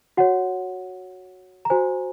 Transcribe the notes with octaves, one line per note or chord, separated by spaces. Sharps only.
F#4 C#5 F#5
A#5
F#4 C5 G#5